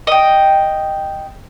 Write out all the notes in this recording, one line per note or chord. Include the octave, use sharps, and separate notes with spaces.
D#5 G5